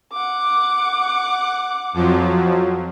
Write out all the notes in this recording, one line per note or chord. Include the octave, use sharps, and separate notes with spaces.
F#5 D6
F2 F3 F#3